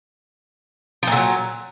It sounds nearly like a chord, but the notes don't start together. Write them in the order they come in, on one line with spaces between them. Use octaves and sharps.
F3 A#2 D3 F#3